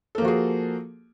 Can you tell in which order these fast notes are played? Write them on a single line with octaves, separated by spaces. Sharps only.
A4 A#3 F3 F#4 G#4